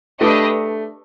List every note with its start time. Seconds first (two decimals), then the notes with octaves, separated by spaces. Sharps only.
0.20 A3 D4 G4 B4 D#5